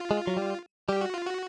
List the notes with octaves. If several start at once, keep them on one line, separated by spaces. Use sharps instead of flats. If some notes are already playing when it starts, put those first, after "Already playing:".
Already playing: F4
G#3
F#3
G3
G3 G4
F#4
F4
F#4